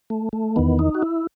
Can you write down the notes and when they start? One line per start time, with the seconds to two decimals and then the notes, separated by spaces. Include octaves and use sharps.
0.10 A3
0.33 A3
0.56 E2 D#3 B3
0.79 D#4
0.95 F#4
1.02 E4